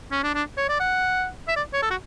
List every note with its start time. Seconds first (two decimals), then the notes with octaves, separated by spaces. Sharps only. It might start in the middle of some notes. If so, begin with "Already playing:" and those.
0.12 C#4
0.23 D4
0.35 D4
0.57 C#5
0.69 D5
0.80 F#5
1.48 E5
1.56 D5
1.73 C#5
1.82 A4
1.90 F#4